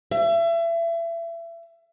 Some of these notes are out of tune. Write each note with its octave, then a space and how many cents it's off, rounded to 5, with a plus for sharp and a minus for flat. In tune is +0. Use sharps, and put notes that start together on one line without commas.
E5 +30